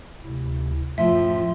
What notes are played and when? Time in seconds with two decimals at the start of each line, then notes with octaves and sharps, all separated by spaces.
0.23 D2 C3 E4
0.98 F#2 A2 F3 F4 E5 C6